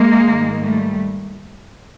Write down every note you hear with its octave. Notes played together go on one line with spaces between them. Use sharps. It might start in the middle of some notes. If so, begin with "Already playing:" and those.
Already playing: G#3 A#3
G#2 D#3 G3
G3 A3